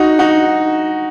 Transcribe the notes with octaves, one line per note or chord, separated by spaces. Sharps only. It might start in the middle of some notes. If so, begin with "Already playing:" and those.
Already playing: D#4 F#4
D#4 F#4